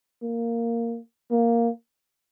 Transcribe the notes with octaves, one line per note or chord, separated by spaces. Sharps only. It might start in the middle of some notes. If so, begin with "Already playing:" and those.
A#3
A#3